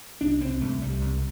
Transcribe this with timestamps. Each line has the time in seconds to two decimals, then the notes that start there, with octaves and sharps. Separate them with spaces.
0.21 C2 D4
0.40 C2 C4
0.61 C2 A3
0.82 C2 G3
1.01 C2